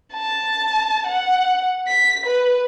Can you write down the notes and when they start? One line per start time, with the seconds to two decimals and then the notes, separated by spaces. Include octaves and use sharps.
0.13 A5
1.07 F#5
1.88 B6
2.26 B4